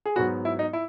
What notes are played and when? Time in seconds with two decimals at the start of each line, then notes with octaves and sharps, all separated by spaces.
0.06 G#4
0.16 G#2 F#3 B3 F#4
0.45 E4
0.59 D#4
0.73 E4